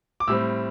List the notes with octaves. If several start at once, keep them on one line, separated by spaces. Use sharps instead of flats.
D6
A2 G3 C4 E6